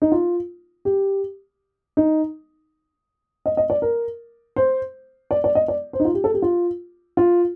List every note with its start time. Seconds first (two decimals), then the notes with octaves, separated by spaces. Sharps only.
0.02 D#4
0.12 F4
0.85 G4
1.97 D#4
3.46 D#5
3.57 D#5
3.70 D5
3.82 A#4
4.56 C5
5.31 D5
5.44 D5
5.55 D#5
5.68 D5
5.93 C5
6.00 D#4
6.05 F4
6.14 G4
6.24 A4
6.34 G4
6.42 F4
7.17 F4